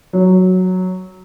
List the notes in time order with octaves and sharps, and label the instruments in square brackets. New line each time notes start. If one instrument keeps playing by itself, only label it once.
[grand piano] F#3